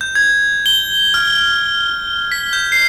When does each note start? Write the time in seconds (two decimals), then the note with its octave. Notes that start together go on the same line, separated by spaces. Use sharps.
0.01 G6
0.15 G#6
0.66 G7
1.14 F6
2.32 B6
2.53 G6
2.72 C7